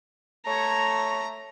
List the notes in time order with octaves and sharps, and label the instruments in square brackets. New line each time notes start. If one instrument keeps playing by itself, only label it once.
[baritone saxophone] A3 [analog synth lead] C#5 [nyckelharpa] A#5